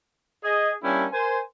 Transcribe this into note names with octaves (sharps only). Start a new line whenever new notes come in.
G#4 D#5
G3 A#3 C#4 D4 E4 G4
A#4 C5 G#5